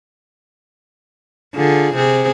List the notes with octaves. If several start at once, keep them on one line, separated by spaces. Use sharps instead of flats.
D3 F4 G#4
C3 C4 G#4